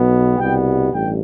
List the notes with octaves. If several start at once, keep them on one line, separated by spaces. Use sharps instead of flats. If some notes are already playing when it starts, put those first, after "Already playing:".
Already playing: B1 B2 B3
C2 B2 G3 B3 G5
A1 G2 G5